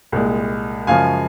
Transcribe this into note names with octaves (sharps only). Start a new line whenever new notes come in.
C2 A#2 G#3
F#2 C#3 F3 G#3 F5 G#5